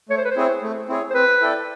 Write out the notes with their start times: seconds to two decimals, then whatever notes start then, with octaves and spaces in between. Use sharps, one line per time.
0.09 A3 C#5
0.17 C5
0.24 B4
0.31 C5
0.36 C4 E4 G#4 C#5
0.62 A3
0.89 C4 E4 G#4 C#5
1.10 C5
1.14 C4 B4
1.41 E4 A4 D5 G5